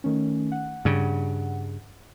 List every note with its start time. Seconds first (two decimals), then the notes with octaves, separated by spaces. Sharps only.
0.04 D#3 A3 C#4
0.52 F#5
0.85 G2 C#3